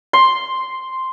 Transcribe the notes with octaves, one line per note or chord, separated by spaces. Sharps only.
C6